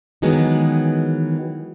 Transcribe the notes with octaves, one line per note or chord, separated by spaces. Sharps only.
D#3 E3 F#3 G#3 B3